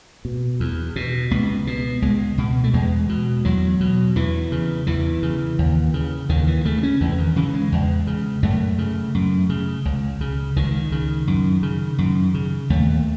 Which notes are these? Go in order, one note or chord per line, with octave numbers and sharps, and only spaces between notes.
B2
E2
B2
C#2 B3
B2
C#2 G#3
B2
A3
E2 G#3
B2
E2 F#3
B2
E2 E3
C#3
E2 E3
C#3
D#2
C#3
D#2 D#3
E3
C#3 A3
C#4
E2 E3
D#3
C#3 E3
G#3
E2
C#3
F#2 A3
C#3
F#2
C#3
C#2
C#3
C#2 D#3
C#3
F#2
C#3
F#2
C#3
D#2 A3